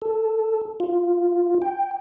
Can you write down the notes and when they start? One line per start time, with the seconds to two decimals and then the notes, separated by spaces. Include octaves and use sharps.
0.02 A4
0.80 F4
1.62 G5